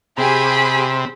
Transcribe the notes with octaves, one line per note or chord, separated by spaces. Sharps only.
C3 G4 G#4 B5